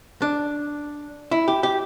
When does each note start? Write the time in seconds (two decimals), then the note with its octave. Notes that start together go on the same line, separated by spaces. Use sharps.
0.22 D4
1.31 E4
1.48 G4
1.63 G4